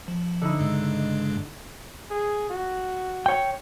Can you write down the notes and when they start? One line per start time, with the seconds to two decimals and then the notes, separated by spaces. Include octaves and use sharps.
0.08 F3
0.41 D3 D#4 E4
0.59 G2 C#3 G#3
2.10 G#4
2.50 F#4
3.26 C#5 G5